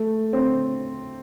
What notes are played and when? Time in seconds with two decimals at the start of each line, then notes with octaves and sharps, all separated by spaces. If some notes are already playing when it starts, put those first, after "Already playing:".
Already playing: A3
0.33 C4